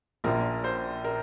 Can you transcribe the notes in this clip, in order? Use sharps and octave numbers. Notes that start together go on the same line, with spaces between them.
A#1 A#2 F3 A#4
C5
A#4